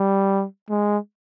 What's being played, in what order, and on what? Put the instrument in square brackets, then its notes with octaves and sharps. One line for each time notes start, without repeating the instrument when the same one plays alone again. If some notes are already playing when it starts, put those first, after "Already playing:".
Already playing: [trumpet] G3
G#3